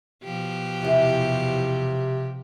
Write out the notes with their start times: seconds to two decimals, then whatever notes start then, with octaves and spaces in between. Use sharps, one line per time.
0.23 B2 F3 G4
0.82 E2 C3 E3